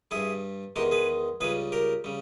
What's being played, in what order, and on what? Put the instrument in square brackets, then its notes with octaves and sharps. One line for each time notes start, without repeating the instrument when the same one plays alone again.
[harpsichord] G2 G3 E4 G#4
E2 D#3 G#3 D#4 G4
G#4 B4
C#2 C#3 G3 G#4 B4
G4 A#4
C#3 G3